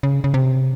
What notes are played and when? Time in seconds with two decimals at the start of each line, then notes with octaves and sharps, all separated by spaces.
0.03 C#3
0.24 C#3
0.34 C3